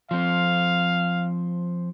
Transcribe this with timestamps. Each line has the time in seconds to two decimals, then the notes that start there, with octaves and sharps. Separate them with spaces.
0.11 F3 C4 F5